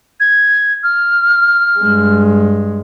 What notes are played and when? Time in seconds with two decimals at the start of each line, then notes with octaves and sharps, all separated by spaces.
0.20 G#6
0.83 F6
1.79 G2 G#3